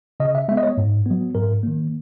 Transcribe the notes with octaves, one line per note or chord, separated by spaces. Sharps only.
C#3 D#5
E5
G#3 B3 E5
D#5
C#5
G#2
F#3 B3
G#2 A#4
D#3 A#3